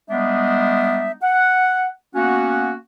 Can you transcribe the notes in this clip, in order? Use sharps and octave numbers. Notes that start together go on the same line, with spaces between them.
G3 G#3 B3 D4 D#4 E5
F#5
A#3 B3 C#4 F#4